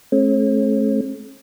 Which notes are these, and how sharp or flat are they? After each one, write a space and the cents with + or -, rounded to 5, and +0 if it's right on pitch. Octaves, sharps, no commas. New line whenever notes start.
A3 -40 C#4 -45